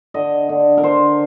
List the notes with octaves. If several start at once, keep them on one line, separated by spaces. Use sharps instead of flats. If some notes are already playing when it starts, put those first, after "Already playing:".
D3 D#5
D3
A#4
D3 C5